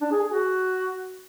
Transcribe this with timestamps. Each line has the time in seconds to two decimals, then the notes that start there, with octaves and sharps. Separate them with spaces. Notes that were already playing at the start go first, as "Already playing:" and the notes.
0.01 D4
0.12 G#4
0.22 G#4
0.33 F#4